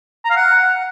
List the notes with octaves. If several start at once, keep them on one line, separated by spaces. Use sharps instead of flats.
A#5
F5
F#5